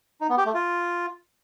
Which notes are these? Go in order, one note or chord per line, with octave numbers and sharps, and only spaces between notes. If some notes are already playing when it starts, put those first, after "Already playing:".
D#4
B3
G4
A3
F4